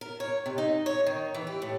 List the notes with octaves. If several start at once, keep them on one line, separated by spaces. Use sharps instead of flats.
A#4
C#5
C3
D#4
C#5
D#3
E3
G4
A2